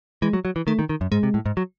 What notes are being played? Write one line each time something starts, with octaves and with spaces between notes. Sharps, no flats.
E3 G#3
F#3
F#3
E3
D#3 A3
D#3
D#3
F#2
G#2 G#3
C3
A2
G#2
F#3